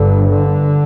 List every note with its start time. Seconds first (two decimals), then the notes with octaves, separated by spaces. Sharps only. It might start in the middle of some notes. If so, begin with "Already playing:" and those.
Already playing: G1 G2 D3
0.29 D3